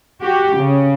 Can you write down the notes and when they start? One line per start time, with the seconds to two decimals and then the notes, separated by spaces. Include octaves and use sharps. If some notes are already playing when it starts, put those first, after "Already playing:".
0.22 F#4 G4
0.57 C#3